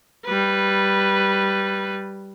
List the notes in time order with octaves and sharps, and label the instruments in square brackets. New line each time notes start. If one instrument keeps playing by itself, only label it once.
[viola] G3 B4